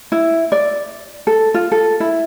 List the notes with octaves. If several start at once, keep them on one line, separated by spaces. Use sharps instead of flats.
E4
D5
A4
F4
A4
E4